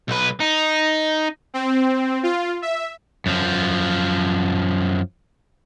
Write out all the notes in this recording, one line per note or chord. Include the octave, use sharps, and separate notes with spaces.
B1 B4
D#4
C4
F4
E5
F#2 F3